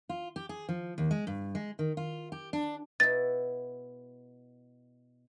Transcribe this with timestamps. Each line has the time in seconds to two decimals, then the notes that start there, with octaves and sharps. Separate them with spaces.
0.09 F4
0.36 G4
0.49 G#4
0.69 F3
0.98 D#2
1.11 G#3
1.27 G2
1.55 G#3
1.79 D#3
1.97 F4
2.32 G4
2.53 D4
3.00 B2 E4 A6